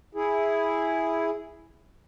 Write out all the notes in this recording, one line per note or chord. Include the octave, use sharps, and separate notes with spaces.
E4 G#4